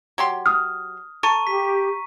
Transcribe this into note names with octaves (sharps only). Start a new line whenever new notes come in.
F#3 G4 C6
D#6 F6
A4 A#5 C#6 D#7
G4 B6